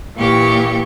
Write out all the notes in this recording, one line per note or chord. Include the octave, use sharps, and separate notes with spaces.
A#2 E3 G4 C#6